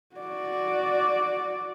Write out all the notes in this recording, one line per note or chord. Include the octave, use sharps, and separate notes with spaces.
F#4 D5